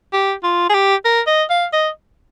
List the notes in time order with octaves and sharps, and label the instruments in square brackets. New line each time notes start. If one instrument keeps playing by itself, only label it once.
[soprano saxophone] G4
F4
G#4
G4
A#4
D#5
F5
D#5